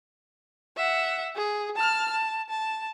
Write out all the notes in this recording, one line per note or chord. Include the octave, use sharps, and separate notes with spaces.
E5 F#5
G#4
A5 F6
A5
A5